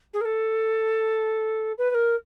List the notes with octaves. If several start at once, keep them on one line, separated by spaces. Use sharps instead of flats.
G#4
A#4
A4
B4
B4
A#4